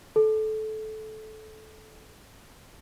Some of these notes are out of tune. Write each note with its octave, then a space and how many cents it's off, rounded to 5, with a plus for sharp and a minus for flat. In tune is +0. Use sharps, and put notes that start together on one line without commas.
A4 -20